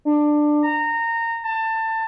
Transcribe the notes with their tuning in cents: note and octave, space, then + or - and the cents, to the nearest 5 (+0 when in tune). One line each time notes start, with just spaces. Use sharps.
D4 +15
A#5 -20
A5 +25